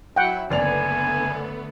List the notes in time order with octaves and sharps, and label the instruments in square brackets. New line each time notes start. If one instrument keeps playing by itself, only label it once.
[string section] F#3 E4 [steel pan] F#5 G5
[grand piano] F#1 D5 F7 [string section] D3 A3 B3 [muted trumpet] G#5